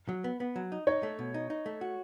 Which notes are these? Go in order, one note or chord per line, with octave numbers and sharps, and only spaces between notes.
F#3
B3
B3
F#3
D#4
D#4 C#5
A3
B2
D#4
D#4
A3
F#4